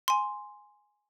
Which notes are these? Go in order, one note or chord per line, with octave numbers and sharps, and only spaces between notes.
G#5 C6